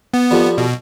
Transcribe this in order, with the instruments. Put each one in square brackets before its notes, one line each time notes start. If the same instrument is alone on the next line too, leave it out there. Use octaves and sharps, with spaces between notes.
[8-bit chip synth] B3
[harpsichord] F2 F3 G3
[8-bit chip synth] B2